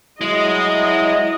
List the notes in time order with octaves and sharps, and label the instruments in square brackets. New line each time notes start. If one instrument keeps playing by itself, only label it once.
[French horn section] F#3 E4 [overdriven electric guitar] G#3 [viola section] D#5